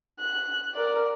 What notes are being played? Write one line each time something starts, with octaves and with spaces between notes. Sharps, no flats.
F#6
A#4 D5